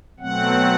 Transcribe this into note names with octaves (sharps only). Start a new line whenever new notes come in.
B2 F#3 A3 C4 F#5